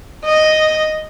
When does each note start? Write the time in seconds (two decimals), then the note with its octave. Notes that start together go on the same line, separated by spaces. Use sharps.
0.25 D#5